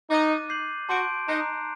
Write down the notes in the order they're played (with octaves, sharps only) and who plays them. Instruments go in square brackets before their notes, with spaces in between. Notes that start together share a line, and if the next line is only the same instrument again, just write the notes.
[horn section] D#4 [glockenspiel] D6 F#6 A6 D#7
[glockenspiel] D6 G6 C7 F#7
[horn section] F#4 [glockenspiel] A5 C6 G6 D7
[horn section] D#4 [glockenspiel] A#5 F#6 C7